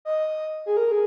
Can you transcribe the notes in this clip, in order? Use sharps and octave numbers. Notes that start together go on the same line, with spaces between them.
D#5
G#4
A#4
G#4